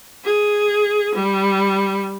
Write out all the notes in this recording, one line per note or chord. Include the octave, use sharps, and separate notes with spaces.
G#4
G3